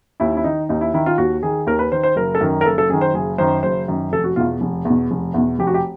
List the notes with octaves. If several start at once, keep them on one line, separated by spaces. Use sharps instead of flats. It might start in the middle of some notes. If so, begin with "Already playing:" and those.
D#2 E4
E4
D#3 D#4
D#2 D#4
E4
D#3 E4
F4
D#2 F#4
D#3 G#4
D#2 A#4
B4
D#3 C5
C5
F#1 A#4
A4
F#2 D#3 A#4
A#4
F#1 A4
A4
F#2 D#3 G#4
C5
F#1 G#4
F#2 D#3 C5
F#1 C5
F#2 D#3
F1 A4
F#4
E2 B2 F4
F1
E2
B2
F1
E2 B2
F1 G4
F#4
G4